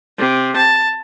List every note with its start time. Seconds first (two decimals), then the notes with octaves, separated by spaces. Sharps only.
0.18 C3
0.56 A5